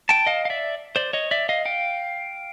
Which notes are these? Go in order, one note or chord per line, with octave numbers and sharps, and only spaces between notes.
G5 A5
D#5 F5
F5
D5 E5
C5 D5
C#5 D#5
D5 E5
D#5 F5
F5 G5